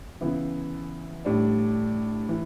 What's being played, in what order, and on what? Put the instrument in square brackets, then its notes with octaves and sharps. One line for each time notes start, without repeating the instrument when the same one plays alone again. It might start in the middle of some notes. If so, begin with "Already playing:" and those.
[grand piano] C#3 E3 B3 E4
A2 G3 D4
E3